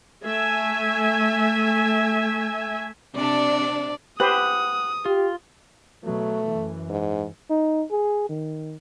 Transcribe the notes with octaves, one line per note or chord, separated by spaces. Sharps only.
A3 E5 G#5
C3 D4 D5
G4 B4 C5 F#5 D#6
F4 G4
B2 F#3 A3
F#2 E3
G#2
D#4
G#4
D#3